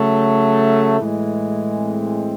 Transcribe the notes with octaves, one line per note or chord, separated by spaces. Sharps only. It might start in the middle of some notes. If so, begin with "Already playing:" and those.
Already playing: C#3 F#3 A3
A2 E3 G#3
C4